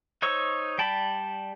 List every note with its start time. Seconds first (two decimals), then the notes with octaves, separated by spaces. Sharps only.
0.22 D#4 C5 C#5 C#6 E6
0.78 G3 G5 A5 B5